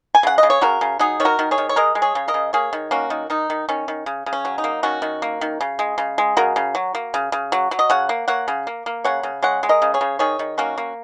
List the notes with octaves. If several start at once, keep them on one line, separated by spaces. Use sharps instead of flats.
G#5
C#3 F#5
D#5
C#3
C#5
C#3 F#4 A#4
C#3
F#3 D#4 G#4
D#3 C#5
F#4 A#4
D#3
G#4 C#5
D#3
C#5
G#3 A#4 D#5
G#3
G#4 C#5
C#3
A#4 D#5
C#3
A#3 G#4 C#5
D#3
A#3 C#4 F#4
D#3
D#3 D#4
D#3
D#3 C#4
D#3
C#3
C#3
C#4
F#3
D#4
A#3
D#3 C#4 F#4
D#3
A#3
D#3
C#3
G#3
C#3
G#3
C#3 F#4 A#4
C#3
F#3
A#3
C#3
C#3
F#3
F#3
D#5
C#3 C#5 F#5
A#3
A#3 C#5 F#5
C#3
A#3
A#3
C#3 C#5 F#5
C#3
G#3 C#5 F#5
G#3
A#4 D#5
C#3
G#4 C#5
C#3
D#3 G#4 C#5
D#3
A#3 C#4 F#4
A#3